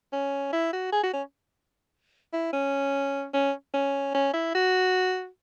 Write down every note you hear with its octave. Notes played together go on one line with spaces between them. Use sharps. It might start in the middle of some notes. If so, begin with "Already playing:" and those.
C#4
E4
F#4
G#4
F#4
C#4
E4
C#4
C#4
C#4
C#4
E4
F#4